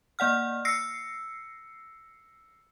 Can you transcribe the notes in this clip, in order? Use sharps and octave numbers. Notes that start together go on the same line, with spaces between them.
A#3 D5 F#5 F6
E6 A#6 C7 C#7